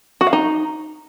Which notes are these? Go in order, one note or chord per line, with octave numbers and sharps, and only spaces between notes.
F#4
F5
D#4